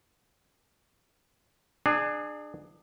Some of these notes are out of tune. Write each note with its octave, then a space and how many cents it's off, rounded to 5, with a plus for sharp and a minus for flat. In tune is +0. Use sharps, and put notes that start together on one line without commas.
D4 +30 G#4 +0